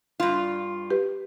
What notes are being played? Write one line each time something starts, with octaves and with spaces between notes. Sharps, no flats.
G2 F4
G4 B4